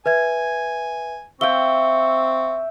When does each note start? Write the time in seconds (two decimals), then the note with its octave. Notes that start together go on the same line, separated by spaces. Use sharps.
0.06 B4 E5 G#5 G#6
1.41 C4 E5 F5 G5 C#6 G7